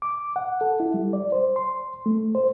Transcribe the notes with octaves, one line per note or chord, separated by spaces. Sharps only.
D6
F#5
A4
E4
G3
D5
C5
C6
A3
C5